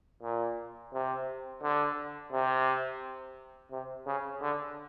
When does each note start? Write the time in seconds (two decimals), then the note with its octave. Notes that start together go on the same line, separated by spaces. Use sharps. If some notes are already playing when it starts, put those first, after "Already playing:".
0.23 A#2
0.94 C3
1.62 D3
2.32 C3
3.71 C3
4.06 C#3
4.41 D3